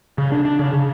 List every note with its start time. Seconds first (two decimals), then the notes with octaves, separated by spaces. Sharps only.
0.18 C#3
0.32 D4
0.45 D4
0.59 C#3
0.73 C#3